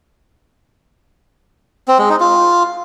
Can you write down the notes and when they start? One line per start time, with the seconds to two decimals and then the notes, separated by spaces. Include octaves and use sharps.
1.88 C4
1.99 G#3
2.09 D#4
2.20 F4